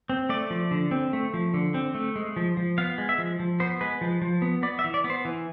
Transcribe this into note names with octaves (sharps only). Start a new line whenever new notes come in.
C4
A3 D5
F3
D3
C4
A3
F3
D3
C4
A3
G#3
F3
F3
B3 F5
G#3
E5
F3
F3
B3 C5
G#3 B4
F3
F3
B3
B3 D5
E5
E3
D5
B3
C5
E3